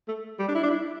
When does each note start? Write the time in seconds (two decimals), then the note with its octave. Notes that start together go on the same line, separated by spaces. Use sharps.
0.08 A3
0.39 G3
0.49 D4
0.55 E4
0.63 D4
0.71 E4